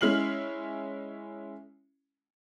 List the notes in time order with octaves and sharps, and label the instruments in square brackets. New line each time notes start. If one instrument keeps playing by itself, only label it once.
[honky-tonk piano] G#3 C#4 E4 F6 C7 F#7